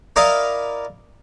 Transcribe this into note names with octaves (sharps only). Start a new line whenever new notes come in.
E4 A#4 D5 D#5 F5